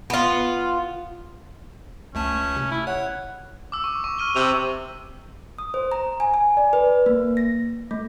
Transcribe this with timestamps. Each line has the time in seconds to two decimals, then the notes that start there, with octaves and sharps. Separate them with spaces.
0.10 B3 F4
2.15 C#2 A3 C#4 A5
2.56 C3
2.71 E4
2.87 C#5 F#5
3.72 D6 E6
3.84 C#6
4.04 C#6
4.18 F6 D#7 G7
4.36 C3 D6 E6 F7
5.58 D#6
5.74 C5
5.92 A#5
6.20 G#5
6.34 G#5
6.57 D5
6.73 B4
7.06 A#3
7.37 A#6
7.91 A3